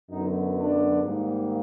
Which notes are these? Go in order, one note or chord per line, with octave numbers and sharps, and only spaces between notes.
F#2 D3 F#3 B3 D#4
D4
G#2 D#3 G3 A#3